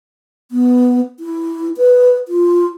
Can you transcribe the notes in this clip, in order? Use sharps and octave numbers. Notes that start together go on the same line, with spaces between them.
B3
E4
B4
F4